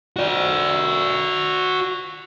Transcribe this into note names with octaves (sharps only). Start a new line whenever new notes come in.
F#4 D5